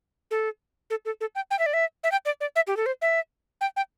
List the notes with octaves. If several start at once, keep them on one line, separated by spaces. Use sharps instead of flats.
A4
A4
A4
A4
G5
G5
E5
D5
E5
E5
G5
D5
D5
E5
G4
A4
C5
E5
G5
G5